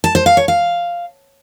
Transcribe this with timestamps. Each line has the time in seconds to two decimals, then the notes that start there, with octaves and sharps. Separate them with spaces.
0.04 A5
0.15 C5
0.26 F5
0.37 C#5
0.48 F5